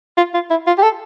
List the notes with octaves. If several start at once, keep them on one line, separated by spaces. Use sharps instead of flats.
F4
F4
E4
F4
G4
A4